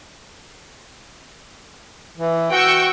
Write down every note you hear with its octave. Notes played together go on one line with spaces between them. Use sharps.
E3
F#4 G5 C#6 E6